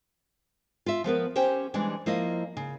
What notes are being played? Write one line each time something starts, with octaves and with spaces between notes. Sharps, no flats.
F4 E5
F3 B3 A#4 B4
C#4 G4 C5 G5
E3 G3 G#3 D4
F3 A#3 E4 D#5
C#3